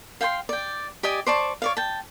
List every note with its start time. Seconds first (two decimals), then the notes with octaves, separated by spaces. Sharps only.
0.21 F5 G5 G#5 C6
0.49 D5 G5
1.03 G4 D5 D#5 G#5
1.26 C5 D5 A5 C#6
1.62 C#5 D5 F5
1.77 G5 A5